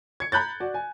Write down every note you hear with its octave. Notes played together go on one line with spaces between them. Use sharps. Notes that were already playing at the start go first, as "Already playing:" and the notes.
G#6 C#7
A#5 B5 F#6 G6 A6
F#4 D5
G#5